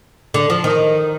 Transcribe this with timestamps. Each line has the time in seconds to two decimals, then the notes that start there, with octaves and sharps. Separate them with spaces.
0.34 D3
0.50 F3
0.64 D#3